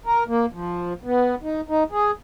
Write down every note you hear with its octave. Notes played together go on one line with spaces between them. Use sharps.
A#4
A#3
F3
B3
D#4
D#4
G#4